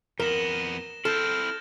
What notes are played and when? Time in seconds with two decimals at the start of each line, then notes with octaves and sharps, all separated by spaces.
0.20 F2 B3 A#4 A#6 E7 G7
1.05 C4 E4 A4 F6 G6 A6 E7